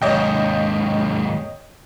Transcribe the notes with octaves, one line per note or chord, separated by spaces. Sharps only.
D#2 G#2 C#5 D#5 G5